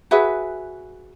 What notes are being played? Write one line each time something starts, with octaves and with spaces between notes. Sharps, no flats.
F#4 G#4 B4 E5